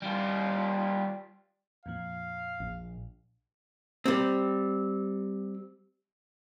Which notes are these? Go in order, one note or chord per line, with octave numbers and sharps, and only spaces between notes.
G3 F4
F2 A#2 F3 F5
A#1
G3 C4